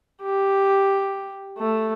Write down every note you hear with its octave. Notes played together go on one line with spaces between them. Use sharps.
G4
A3